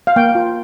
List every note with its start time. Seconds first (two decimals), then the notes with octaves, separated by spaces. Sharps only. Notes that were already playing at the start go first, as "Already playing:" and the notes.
0.07 F5
0.16 A#3 G5
0.35 F4